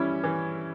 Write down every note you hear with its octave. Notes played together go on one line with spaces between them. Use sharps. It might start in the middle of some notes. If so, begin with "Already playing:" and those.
Already playing: E3 G3 C#4 E4
E3